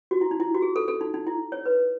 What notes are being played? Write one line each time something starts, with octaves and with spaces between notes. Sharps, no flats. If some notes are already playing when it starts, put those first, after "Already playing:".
F#4
E4
D#4
E4
F#4
G#4
A4
A4
D#4
D#4
E4
C#5
B4